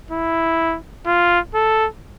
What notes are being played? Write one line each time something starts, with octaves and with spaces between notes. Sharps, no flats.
E4
F4
A4